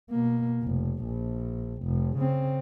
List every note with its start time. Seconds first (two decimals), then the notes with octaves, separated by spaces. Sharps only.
0.11 B2 A#3
0.63 F1
1.04 A#1
1.83 F1
2.18 C#3 C4